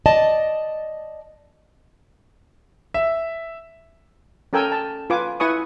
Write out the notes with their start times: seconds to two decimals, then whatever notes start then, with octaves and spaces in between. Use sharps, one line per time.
0.06 D5 D#5 A5
2.94 E5
4.53 C#4 A4 A#4 G5 G#5 E6
4.72 A5
5.10 F4 B4 G#5 D6
5.40 E4 B4 G#5 C#6 D#6